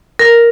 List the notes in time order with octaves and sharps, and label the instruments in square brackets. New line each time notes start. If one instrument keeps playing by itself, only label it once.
[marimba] A#4